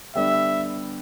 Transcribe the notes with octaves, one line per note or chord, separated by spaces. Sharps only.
D3 G3 B3 D4 E5